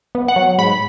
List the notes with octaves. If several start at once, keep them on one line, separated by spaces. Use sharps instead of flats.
B3
F#5
F#3
G#2 B5